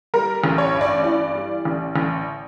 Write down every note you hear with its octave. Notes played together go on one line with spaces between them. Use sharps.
G3 A#4
A1
C#5
G2
D5
E3 D5
G3
A1
A1